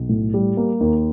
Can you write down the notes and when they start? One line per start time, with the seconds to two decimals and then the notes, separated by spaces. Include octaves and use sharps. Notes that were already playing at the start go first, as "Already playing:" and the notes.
Already playing: B1
0.09 A2
0.34 G3
0.57 A#3
0.81 D#2